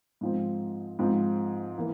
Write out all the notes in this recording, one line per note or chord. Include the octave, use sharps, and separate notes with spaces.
G#2 F3 C4
G#2 F3 C4
E3 A#3